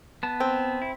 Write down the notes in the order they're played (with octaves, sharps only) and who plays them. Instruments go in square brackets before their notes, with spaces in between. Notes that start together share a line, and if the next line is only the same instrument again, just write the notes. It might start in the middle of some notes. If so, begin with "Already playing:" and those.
[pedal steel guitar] B3 A5
[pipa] C4
[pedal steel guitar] E4